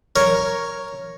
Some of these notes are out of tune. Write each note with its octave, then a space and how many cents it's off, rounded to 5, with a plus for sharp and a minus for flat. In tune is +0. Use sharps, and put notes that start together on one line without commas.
A#4 +0 C#5 +0